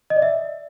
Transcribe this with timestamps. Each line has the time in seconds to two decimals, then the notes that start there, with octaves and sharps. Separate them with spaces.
0.10 D#5
0.16 D5
0.22 E5